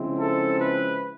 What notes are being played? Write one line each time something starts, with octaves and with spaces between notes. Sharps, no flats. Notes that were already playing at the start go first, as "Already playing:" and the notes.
Already playing: C#3 F3 G#3 C4 E4
A4
B4